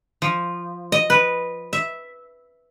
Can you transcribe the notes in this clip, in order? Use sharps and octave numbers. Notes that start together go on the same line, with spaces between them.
F3
D#5
B4
E5